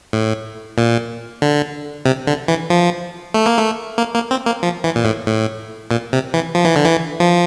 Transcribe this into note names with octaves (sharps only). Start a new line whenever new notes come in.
A2
A#2
D3
C3
D3
E3
F3
A3
A#3
A3
A#3
A#3
C4
A#3
F3
E3
A#2
A2
A2
A#2
C3
E3
F3
E3
D3
E3
F3